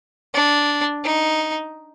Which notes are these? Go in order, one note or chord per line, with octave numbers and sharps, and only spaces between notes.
D4
D#4